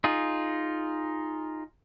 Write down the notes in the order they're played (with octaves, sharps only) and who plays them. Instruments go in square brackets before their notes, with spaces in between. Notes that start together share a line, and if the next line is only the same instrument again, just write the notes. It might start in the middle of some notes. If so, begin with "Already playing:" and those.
[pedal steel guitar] D#4 F4 G#4